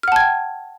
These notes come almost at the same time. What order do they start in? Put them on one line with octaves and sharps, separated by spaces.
F6 F#5 A5 G#6 G5